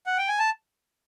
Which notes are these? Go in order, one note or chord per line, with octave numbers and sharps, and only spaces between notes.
F#5
G5
G#5
A5